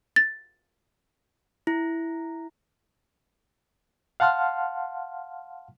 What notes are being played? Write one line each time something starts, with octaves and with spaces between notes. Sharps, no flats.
A6
E4
F5 F#5 A5 C6 F6